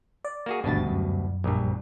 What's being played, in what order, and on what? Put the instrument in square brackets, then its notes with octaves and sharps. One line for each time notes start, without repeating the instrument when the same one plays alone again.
[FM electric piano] D5
[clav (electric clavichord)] A#3 F#4 G#4
[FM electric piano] G#1 D4 A6 [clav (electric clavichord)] D2 G2 B2
[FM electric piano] F#2
[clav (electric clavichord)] A#1 G2